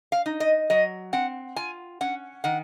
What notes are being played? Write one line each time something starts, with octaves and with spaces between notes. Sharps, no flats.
F5
D#4
D#5
F#3 D#5
C4 F#5
F4 G#5
C#4 F#5
D#3 F#5